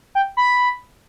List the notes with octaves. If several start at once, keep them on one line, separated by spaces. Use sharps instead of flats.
G5
B5